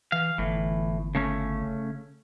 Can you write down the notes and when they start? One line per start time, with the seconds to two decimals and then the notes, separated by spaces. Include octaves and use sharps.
0.12 E3 F5
0.38 G1 A2 E3
1.15 C#3 A3 C#4